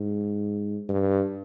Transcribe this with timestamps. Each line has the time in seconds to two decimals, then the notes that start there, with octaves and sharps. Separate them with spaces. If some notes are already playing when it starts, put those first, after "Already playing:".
Already playing: G#2
0.89 G2